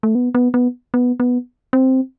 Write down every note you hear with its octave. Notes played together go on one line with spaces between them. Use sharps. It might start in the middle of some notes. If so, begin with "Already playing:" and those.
A3
B3
B3
B3
B3
B3
C4